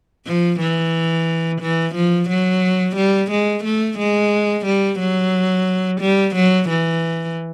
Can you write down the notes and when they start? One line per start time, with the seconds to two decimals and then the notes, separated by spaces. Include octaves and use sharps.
0.26 F3
0.60 E3
1.61 E3
1.95 F3
2.29 F#3
2.97 G3
3.31 G#3
3.64 A3
3.99 G#3
4.66 G3
5.00 F#3
6.01 G3
6.35 F#3
6.69 E3